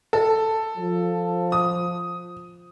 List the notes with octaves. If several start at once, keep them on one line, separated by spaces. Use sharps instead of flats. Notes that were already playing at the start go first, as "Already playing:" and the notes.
A4
F3
D#6